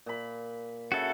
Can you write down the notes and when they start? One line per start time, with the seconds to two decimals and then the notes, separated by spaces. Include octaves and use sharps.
0.06 A#2 B5
0.92 C#3 F#4 A4 E5